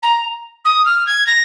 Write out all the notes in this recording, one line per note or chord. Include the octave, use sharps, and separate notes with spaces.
A#5
D#6
F6
G#6
A#6